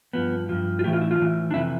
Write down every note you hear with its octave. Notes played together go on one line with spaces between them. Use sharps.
G2 F3 B3
G2 F3
F4
A2 E3 G4
F4
E4
F4
A2 E3
D4
F2 C3 E3 E4